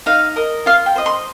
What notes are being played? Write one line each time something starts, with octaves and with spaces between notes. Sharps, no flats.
D#4 F5
A#4 D#5
F4 F5
G5
C5 D#5
C6